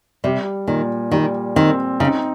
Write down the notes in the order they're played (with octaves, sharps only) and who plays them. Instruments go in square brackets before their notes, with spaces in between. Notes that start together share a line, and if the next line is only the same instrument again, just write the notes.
[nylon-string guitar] C3 [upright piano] G3
[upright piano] A#2 [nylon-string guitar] D#3
[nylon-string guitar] D#3 [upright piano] G3
[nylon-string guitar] D#3 [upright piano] C4
[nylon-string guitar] C#3 [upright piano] D#4